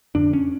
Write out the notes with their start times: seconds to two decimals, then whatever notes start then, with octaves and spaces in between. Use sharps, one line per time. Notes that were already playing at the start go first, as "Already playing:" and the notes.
0.15 F2 D3 D4
0.33 C#4